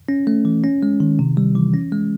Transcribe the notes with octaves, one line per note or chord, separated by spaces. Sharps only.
C#4
A3
E3
C#4
G#3
D#3
C3
G3
E3
C#4
G#3